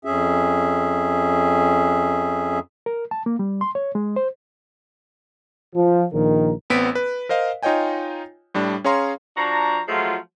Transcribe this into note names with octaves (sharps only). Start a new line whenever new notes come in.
F2 C#4 G#4 E5
A#4
A5
A#3
G3
C6
C#5
G#3
C5
F3
A#1 D#3 A#4
A1 B3 C4 B6 D7
B4
A#4 C5 D#5 F5
D#4 F4 C#5 D#5 G5 G#5
A2 G3 D4
C#4 G#4 C#5 F5 A#5 C6
F3 D4 F#4 A#5
F3 F#3 G#3 A3 F4